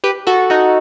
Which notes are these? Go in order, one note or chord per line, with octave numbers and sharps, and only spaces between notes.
G4 B4
F#4 A4
D#4 F#4